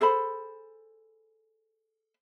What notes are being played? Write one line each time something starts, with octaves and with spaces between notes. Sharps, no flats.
G#4 A4 C5 B5